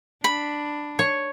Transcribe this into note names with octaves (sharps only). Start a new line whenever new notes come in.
D4 B5
C#5